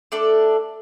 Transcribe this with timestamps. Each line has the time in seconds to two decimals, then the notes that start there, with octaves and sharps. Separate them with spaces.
0.12 A3 D4 A4 D5